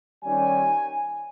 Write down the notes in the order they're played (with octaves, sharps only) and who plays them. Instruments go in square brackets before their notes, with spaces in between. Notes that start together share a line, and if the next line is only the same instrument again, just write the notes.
[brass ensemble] D#3 G3 C#4 G#5